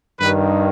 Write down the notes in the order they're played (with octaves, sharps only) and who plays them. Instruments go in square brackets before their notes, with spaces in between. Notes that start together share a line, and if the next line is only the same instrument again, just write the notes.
[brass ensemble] G2 D#3 B4